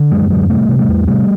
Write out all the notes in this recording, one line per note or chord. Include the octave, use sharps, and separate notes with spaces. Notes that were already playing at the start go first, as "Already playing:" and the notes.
Already playing: D3
F#2 F#3 G#3
D3 F#3 G#3
C3 G3 A3
C3
G3 A3
E2
C3 G3 A3